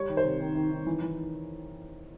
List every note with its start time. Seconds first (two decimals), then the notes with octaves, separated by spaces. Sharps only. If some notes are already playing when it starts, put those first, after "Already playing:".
Already playing: G3 C#5
0.09 D#3
0.17 C5
0.25 C3
0.40 D#3
0.55 D#3
0.71 D#3
0.87 E3
1.02 E3